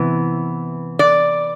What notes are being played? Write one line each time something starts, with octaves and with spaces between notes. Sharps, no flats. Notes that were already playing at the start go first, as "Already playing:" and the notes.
Already playing: C3 E3 B3
D5